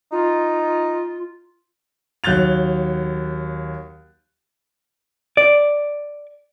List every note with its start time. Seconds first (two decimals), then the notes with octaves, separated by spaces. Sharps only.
0.12 D#4 F4
2.24 D#2 F#3 F#6 G6 A6 F7
5.37 D5